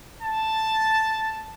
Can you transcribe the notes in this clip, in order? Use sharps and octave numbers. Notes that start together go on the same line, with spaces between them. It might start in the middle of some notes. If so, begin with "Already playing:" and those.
A5